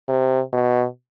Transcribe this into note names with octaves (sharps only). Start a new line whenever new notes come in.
C3
B2